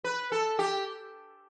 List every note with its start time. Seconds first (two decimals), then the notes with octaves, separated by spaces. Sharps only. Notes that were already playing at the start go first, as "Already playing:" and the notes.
0.04 B4
0.32 A4
0.59 G4